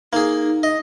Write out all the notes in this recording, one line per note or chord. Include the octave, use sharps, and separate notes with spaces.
A#3 D#4 G#4
D#5